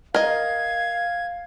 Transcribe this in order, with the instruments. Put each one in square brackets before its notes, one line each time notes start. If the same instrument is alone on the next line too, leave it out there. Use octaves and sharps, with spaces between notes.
[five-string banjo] A#4 D#5 [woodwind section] F5 [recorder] G#6